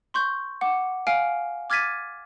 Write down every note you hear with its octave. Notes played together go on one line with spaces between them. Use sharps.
C6 C#6 G6
F#5 D6
F5 G#5 F6 D7
D6 F6 G#6 A6 B6 D#7